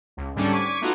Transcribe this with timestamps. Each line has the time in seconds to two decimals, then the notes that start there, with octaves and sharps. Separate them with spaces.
0.17 C#2
0.35 G#2 D3 G3 A3 C#4 D4
0.52 C#6 D6 G#6 B6 D#7
0.81 A3 B3 D#4 F4 F#4